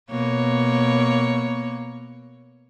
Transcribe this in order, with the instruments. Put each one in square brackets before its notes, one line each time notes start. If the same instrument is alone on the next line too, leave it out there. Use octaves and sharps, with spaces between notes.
[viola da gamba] B2 A#3 C#5